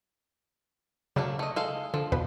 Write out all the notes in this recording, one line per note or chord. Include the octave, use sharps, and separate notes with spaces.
C#3 F#3 A3 A#3 D4
A3 D#5
G#3 A4 F5
D3 F3
E2 B2 B4